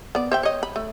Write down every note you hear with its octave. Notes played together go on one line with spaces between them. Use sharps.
B3 D5
C5 E5 G5
C#5 D#5
B5
A3